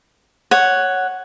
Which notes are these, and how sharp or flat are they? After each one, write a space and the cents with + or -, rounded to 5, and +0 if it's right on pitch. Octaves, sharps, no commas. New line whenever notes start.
C#5 +0 F#5 +0